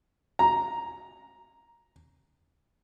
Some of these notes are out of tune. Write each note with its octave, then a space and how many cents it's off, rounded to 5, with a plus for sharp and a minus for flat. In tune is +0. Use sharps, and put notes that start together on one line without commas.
A#5 +5